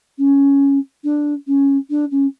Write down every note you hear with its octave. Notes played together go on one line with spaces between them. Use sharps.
C#4
D4
C#4
D4
C#4